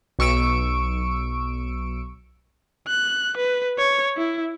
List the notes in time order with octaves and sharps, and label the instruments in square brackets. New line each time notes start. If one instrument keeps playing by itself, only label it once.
[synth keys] B1 C#6 E6 D7
[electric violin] F#6
B4
C#5
E4